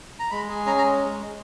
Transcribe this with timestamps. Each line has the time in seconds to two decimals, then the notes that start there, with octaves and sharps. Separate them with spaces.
0.19 A#5
0.31 G#3 B5
0.49 G#4
0.66 C#4 A#5
0.78 A#5
0.84 G#3